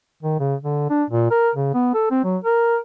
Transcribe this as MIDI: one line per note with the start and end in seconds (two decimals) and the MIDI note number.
0.23 0.37 51
0.40 0.55 49
0.63 0.88 50
0.90 1.04 62
1.10 1.27 46
1.31 1.50 70
1.55 1.71 49
1.74 1.91 59
1.94 2.09 69
2.11 2.23 60
2.24 2.37 54
2.44 2.77 70